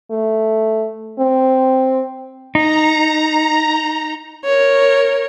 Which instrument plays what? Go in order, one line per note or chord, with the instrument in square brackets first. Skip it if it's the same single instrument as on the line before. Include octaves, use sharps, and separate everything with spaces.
[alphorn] A3
C4
[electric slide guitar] D#4 [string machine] A#5
[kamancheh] A#4 C#5